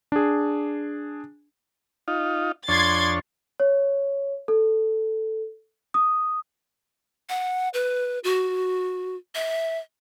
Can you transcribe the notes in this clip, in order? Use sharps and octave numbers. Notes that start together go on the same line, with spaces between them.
D4 G#4
D#4 F4
F2 D4 C#5 C6 G#6 A6
C#5
A4
D#6
F#5
B4
F#4
E5